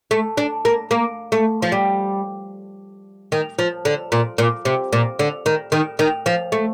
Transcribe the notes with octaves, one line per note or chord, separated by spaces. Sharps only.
A3
D4
A#3
A#3
A3
F3
G3
D#3
F3
D3
A#2
A#2
C3
A#2
D3
D#3
D#3
D#3
F3
A3